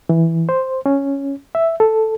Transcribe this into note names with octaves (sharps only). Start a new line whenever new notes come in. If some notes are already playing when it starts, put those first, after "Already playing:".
E3
C5
C#4
E5
A4